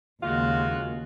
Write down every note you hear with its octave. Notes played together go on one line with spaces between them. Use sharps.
D#2 C#3 G#3 F4 F#4